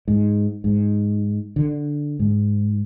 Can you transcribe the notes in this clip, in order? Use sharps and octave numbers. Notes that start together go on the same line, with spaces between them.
G#2
G#2
D3
G#2